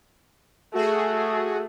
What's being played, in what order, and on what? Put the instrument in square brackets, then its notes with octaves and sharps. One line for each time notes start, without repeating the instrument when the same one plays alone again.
[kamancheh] A3 [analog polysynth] F#4 G#4